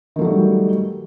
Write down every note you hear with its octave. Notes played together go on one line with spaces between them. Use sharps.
D#3 F#3 G3 A3